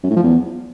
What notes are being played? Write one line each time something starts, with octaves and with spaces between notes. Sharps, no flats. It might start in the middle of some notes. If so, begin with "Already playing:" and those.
F#2
A2
F3
E2